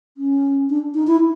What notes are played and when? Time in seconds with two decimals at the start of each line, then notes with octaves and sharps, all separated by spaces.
0.17 C#4
0.69 D4
0.94 D#4
1.07 E4